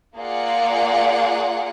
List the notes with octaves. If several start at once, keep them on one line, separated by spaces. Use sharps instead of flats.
A#3 F4 G#4 D5 F#5